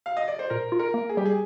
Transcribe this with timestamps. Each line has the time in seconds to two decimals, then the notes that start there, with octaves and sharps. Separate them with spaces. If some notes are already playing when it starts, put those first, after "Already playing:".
0.06 F5
0.17 D#5
0.28 D5
0.39 C5
0.50 A#2 A#4
0.72 F4
0.79 A#4
0.94 A#3
1.09 G#4
1.17 G3 G4
1.26 G#4